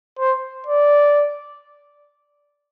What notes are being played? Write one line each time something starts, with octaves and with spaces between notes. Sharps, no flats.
C5
D5